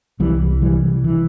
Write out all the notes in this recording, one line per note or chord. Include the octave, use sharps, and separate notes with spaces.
C2 E3 G3
C3 E3 G3
E3